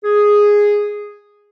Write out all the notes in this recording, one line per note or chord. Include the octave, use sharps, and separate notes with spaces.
G#4